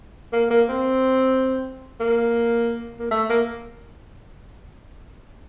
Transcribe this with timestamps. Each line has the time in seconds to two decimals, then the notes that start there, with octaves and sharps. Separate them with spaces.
0.33 A#3
0.51 A#3
0.69 C4
2.00 A#3
3.00 A#3
3.11 A3
3.30 A#3